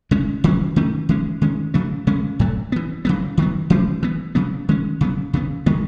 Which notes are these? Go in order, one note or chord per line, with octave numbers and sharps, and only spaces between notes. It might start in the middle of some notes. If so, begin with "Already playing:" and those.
C#3 G#3 C#4
D#3 F#3 C#4
D#3 A3 C#4
E3 G#3 C#4
D#3 G#3 C#4
C#3 F#3 A3
C#3 G#3 C#4
A2 F#3 A3
E3 B3
C#3 F#3 B3
D#3 F#3 B3
E3 A3 C#4
E3 B3
C#3 F#3 B3
D#3 G#3 C#4
C#3 F#3 B3
C#3 E3 B3
D#3 G#3 B3